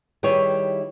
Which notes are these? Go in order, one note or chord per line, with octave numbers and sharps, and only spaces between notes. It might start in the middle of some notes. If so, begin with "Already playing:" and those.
D#3 G3 E4 G#4 B4 C#5